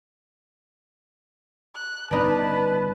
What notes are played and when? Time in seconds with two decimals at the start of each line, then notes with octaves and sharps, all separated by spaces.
1.75 F#6
2.11 G1 C#3 B3 D4 D#4 B4 A5